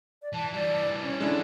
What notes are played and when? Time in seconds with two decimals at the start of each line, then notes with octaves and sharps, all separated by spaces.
0.22 D5
0.34 E3 A5
0.55 E3 G3 D5
1.03 C#4
1.21 G#3 D4 E4 A4 F#5